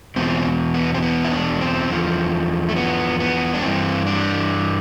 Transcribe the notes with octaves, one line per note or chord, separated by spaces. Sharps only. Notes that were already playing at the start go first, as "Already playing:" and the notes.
E2 B2 C4
B3
C4
B3
E4
D4
C4
E2 D3 F3
A3
B3
B3
D4
G2 E3 C4
D4